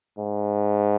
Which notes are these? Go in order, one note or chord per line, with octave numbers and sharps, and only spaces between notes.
G#2